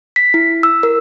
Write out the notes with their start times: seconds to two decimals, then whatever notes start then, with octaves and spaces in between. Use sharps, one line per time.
0.16 B6
0.34 E4
0.63 E6
0.83 A#4